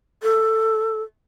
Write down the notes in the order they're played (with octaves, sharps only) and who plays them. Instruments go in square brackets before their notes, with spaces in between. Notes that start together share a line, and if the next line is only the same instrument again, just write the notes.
[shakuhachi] A4